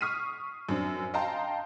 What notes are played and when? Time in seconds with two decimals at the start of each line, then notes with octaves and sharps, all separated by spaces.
0.01 C#6 D#6 F6 B6 C7 D#7
0.69 F#2 C4 D4
1.14 D#5 F5 G5 A5 A#5 C6